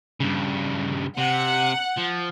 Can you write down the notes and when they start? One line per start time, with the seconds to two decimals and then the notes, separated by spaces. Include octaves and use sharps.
0.20 G2 C#3
1.18 C3 F#5
1.97 F3